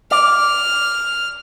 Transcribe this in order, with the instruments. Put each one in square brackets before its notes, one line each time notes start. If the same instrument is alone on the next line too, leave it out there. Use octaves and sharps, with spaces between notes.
[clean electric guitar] D5 [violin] F6